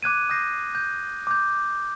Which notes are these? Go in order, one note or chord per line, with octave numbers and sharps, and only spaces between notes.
D6 F#6 G#6 D#7
D#6 G6 A#6 C7
G6
D6 G6